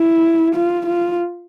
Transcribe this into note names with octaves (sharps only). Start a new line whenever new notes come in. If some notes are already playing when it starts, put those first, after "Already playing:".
Already playing: E4
F4
F4